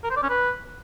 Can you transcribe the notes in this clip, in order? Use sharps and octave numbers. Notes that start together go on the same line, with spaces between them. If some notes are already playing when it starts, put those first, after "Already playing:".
A#4
C5
D5
C#4
B4